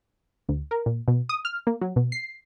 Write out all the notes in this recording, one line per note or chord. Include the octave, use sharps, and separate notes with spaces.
D2
A#4
A#2
B2
D#6
F6
A#3
F#3
B2
C7